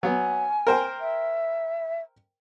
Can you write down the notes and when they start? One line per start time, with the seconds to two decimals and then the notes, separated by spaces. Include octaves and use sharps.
0.03 F#3 B3 G#5
0.67 A#4 C5 G5
1.00 E5